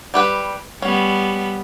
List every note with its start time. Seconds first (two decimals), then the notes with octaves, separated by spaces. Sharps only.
0.14 G3 G4 B4
0.82 G3 B3 C#4